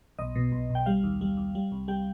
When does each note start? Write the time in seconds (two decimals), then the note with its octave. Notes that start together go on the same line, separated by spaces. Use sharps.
0.19 B1 D#5
0.35 B2
0.52 B1
0.70 B1
0.75 G5
0.86 G3 F5
1.04 D#2
1.21 G3
1.37 D#2
1.55 G3
1.72 C2
1.88 G3 G5